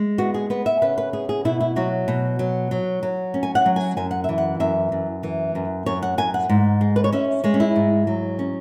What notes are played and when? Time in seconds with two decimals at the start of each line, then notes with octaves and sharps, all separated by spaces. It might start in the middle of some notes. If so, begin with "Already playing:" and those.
Already playing: G#3
0.18 B3 F#4
0.34 G#4
0.50 B3 B4
0.66 E5
0.82 C#3 B4
0.98 B4
1.13 B3 G#4
1.29 G#4
1.45 B2 E4
1.60 E4
1.76 F#3 F#4
2.08 B2
2.39 F#3
2.71 F#3
3.03 F#3
3.34 C#4
3.43 G#5
3.55 F#5
3.66 F#3
3.76 G#5
3.97 F#2 G#5
4.11 F#5
4.24 E3 E5
4.38 F#5
4.60 F#2 E5
4.92 F#2
5.23 E3
5.55 F#2
5.86 F#2 C#5
6.02 F#5
6.18 F#2 G#5
6.34 F#5
6.49 G#2
6.81 G#3
6.96 B4
7.04 C#5
7.12 C#4 E5
7.44 G#3 C#5
7.54 C#4
7.60 E4
7.76 G#2
8.07 F#3
8.39 C#4